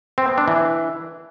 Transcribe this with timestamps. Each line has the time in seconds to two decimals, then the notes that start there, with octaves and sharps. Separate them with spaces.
0.18 C4
0.28 B3
0.38 D4
0.48 E3